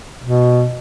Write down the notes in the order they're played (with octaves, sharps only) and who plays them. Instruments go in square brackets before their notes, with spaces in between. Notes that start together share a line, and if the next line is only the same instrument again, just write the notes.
[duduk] B2